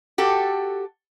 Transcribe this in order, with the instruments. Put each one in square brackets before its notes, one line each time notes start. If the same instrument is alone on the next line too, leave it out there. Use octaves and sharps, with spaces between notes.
[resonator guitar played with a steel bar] F#4 G4 A4